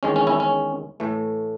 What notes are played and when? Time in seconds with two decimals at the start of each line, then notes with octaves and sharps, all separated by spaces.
0.03 E2 D#3 G#3 C#4
0.16 C#4
0.27 C#4 E4
0.40 C#4
1.00 A2 E3 A3